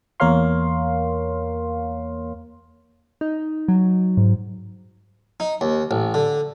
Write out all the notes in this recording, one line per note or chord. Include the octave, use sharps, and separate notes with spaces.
E2 A#3 A#4 C#5 F5 C6
D#4
F#3
G#2
D#4
D#2
A1
D3